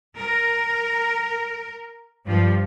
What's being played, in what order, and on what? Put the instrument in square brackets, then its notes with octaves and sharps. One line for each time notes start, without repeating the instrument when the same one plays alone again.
[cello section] A#4
G2 F3